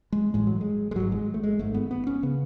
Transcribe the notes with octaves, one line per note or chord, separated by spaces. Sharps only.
G#3
A1 A2 G#3
F#3
G#3
G#3
G#1 G#2 F#3
G#3
A3
G#3
G#1 G#2 A3
B3
B3
C#4
C#3 B3